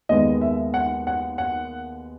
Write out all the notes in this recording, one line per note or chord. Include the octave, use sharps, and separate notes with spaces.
D#2 D#3 G#3 B3 D#5
E5
F#5
F#5
F#5